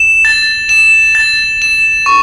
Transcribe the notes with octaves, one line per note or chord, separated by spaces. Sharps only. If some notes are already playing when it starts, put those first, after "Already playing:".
Already playing: E7
A6
E7
A6
E7
C#6